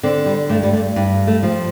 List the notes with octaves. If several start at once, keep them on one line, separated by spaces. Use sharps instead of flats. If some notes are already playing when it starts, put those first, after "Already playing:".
D3 C4
G3
G2 A3
G3
A3
G2
A3
F3